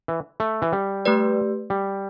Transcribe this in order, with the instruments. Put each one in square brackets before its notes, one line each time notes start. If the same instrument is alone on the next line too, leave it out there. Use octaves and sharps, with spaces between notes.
[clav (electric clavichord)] E3
A3
E3
G3
[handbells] A3 G4 B4 D5
[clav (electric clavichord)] G3